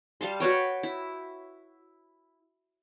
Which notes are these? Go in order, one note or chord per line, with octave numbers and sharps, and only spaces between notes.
G3 F5 A5 C6
F#4 B4 C#5 G5
E4